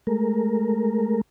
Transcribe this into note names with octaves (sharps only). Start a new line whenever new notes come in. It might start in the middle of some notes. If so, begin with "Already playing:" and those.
G#3 A3 A#4